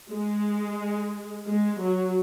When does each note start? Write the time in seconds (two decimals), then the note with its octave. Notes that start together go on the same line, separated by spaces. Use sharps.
0.10 G#3
1.47 G#3
1.81 F#3